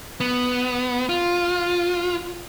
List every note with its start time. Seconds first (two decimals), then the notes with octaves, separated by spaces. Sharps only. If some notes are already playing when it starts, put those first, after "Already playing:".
0.20 B3
1.09 F4